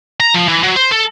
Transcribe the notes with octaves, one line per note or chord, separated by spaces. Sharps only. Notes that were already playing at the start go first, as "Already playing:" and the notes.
A#5
F3
E3
F#3
C5
A4